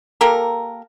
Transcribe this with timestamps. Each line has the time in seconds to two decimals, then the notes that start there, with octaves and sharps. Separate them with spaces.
0.21 A#3 G4 A4 A#4